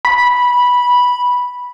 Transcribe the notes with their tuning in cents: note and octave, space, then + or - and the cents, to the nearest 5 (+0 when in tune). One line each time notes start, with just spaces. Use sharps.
B5 -10